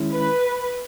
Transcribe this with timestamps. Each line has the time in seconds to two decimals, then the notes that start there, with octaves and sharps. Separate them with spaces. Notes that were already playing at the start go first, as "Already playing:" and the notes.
Already playing: D#3 G#3 C#4 E4
0.12 B4